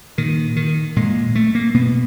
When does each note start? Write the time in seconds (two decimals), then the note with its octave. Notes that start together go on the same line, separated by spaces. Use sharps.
0.18 A#2 D#3
0.56 D#3
0.96 A#2 G#3
1.35 A3
1.55 A#3
1.74 B2 B3